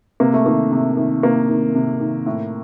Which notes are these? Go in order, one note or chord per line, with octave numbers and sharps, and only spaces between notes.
C3 A#3
A3
D#3 A#3
C3
D#3
C3 A#3
D#3
C3
D#3
A2